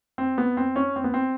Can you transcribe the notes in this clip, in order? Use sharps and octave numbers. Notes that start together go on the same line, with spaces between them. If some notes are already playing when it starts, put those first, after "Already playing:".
C4
B3
C4
C#4
C4
B3
C4